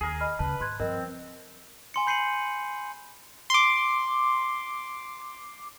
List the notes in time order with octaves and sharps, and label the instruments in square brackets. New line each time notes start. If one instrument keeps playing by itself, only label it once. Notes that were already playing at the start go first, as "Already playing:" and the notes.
[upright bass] D#2 [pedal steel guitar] G#4 A#4
[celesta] D#5 B5 F6
[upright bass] D2 C#3 [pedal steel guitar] B4 [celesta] A5
[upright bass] G#2 [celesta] C6 F#6 G#6
[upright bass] G2 F3 [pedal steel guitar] C4 [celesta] A#4 D#5
[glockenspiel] G#5 C6 C#7
B5 G6 C7 C#7 D#7 F#7
[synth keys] C6 D6